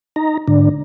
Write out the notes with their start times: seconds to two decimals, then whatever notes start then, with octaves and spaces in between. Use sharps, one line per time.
0.16 D#4 A#5
0.48 G#2 D3 D4